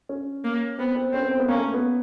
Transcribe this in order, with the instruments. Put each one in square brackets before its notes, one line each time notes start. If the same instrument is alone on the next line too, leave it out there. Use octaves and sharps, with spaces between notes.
[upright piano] C#4
[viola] A#3
[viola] B3 [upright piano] C4
[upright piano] C4
[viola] C4 [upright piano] C#4
[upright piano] B3
C4
B3
[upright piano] A#3 [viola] C#4
[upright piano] A3
A#3
B3